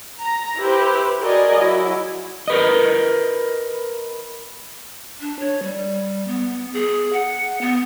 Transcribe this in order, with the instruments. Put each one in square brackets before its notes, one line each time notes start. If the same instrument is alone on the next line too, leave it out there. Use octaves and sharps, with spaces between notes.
[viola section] A#5
E4 G4 B4 C5
F#4 G#4 A#4 D5 D#5 G#5
F#3 E4
[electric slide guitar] A#4 B4 D#5
[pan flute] D4
C#5
G3
B3
G#4
F#5
B3